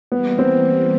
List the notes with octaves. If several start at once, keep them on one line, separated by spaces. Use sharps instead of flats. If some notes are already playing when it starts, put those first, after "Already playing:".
E3 G3 A#3 B3
C4